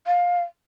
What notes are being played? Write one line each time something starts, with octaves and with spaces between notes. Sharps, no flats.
F5